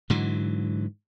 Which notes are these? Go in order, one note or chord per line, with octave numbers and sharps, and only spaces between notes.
G#2 D3 E3 F#3